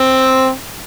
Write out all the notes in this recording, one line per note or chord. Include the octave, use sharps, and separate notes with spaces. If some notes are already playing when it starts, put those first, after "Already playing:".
Already playing: C4